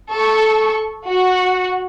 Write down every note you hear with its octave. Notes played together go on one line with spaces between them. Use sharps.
A4 C#6
F#4